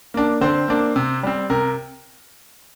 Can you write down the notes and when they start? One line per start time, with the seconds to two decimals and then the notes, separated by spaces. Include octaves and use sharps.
0.14 A#3 D4
0.41 D3 C4 C5
0.68 A#3 D4
0.96 C3
1.23 G3 C4
1.50 C3 A#4